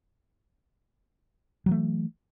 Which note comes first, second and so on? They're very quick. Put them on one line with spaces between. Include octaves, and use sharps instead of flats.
F#3 E3 A3